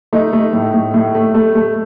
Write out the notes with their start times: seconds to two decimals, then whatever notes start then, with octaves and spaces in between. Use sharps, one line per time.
0.13 A3 D#4
0.33 A3
0.53 A2
0.74 A2
0.94 A2
1.15 A3
1.34 A3
1.55 A3